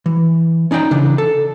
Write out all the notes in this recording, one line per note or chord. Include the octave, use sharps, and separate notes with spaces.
E3
C#4 D#4 D5 E5 G5 A#5
C#3 E3 D4
A4